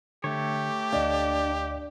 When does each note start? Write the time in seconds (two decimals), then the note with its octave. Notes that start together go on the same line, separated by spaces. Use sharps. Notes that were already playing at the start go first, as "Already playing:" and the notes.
0.24 D3 A3 G4 C#5
0.92 D2 D4 D#5 F5